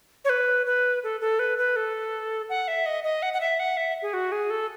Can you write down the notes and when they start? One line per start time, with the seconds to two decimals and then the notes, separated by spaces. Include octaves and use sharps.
0.25 C#5
0.29 B4
0.66 B4
1.04 A4
1.21 A4
1.39 B4
1.58 B4
1.76 A4
2.49 F#5
2.68 E5
2.86 D#5
3.04 D#5
3.22 F#5
3.33 F#5
3.41 E5
3.59 F#5
3.77 E5
4.02 G#4
4.14 F#4
4.32 G#4
4.50 A4